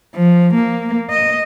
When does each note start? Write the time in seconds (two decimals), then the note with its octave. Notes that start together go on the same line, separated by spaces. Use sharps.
0.14 F3
0.54 A#3
1.10 D#5